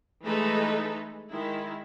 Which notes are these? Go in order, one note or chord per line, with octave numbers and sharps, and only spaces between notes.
E3 G#3 A3 D#4 A4 B4
D#3 G#3 E4